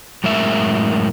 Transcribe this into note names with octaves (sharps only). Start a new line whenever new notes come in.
F#2 A2 G#3 A#4 E5